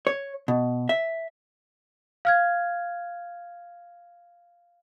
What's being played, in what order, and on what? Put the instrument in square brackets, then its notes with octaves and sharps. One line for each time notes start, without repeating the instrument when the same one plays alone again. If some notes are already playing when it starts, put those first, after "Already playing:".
[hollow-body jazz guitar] C#5
B2
E5
[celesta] F5 F6 G#6